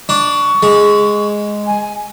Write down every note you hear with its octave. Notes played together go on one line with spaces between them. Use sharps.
D4 C#6
G#3
G#5